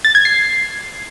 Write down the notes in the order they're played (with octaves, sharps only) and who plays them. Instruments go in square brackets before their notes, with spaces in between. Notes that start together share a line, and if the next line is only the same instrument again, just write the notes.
[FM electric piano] A6
G#6
C7